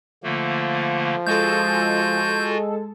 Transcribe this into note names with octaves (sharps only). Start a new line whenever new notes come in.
D3 F3 A3 A#3
G#3 F4 F#4 A4 G6